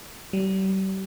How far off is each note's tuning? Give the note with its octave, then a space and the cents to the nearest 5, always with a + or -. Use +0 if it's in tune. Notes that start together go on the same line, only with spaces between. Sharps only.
G3 -40